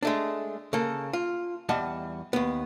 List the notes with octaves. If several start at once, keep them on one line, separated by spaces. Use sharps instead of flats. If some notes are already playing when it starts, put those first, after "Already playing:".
G#3 A3 D4
C#3 A#3 A4
F4
E2 G3 D#5 F#5 A5
D#2 B3